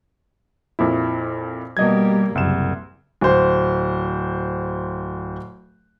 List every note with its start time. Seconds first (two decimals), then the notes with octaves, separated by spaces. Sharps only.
0.79 F2 A#2 E4
1.77 B2 G3 A#3 D#5 G#6
2.35 F#1 C2 E7
3.21 D1 C5